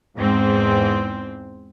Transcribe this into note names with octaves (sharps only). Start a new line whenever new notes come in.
E2 G#2 C4